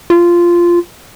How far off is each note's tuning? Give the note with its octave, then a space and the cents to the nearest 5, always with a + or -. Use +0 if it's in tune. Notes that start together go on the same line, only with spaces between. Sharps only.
F4 -10